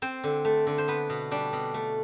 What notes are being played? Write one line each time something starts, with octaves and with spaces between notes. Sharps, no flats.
C4 C5
D3
A3
D3
C5
B3 B4
B2
G3 D4
B2
A3